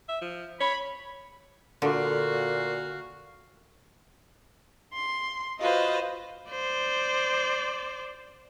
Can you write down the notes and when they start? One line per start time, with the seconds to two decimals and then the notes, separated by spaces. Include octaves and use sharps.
0.09 E5
0.22 F3
0.60 C#5 B5
1.82 A#2 D3 F#4 F5
4.94 C6
5.59 F4 F#4 B4 C5 D#5
6.51 C5 D5